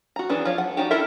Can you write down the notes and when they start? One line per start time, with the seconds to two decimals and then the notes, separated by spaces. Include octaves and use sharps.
0.16 F#4 A#5
0.29 E3 D4 G#4 B4
0.45 F3 C#5 F5
0.58 F#5
0.77 D4 D#4 F#4 G4
0.91 D4 E4 A4 A#4 E5